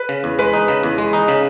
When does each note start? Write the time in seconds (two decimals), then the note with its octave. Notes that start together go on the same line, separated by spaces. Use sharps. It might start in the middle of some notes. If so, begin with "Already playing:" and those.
Already playing: B4
0.09 C#3
0.24 E2
0.39 G#3 B4
0.53 D#4
0.68 C#3
0.83 E2
0.98 G#3
1.13 D#4
1.28 C#3